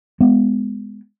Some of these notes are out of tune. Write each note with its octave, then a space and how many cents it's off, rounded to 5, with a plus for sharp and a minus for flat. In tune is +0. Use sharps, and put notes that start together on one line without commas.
G#3 +0 B3 +20